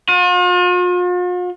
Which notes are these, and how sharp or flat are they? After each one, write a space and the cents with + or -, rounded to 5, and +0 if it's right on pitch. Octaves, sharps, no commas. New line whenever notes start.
F4 +45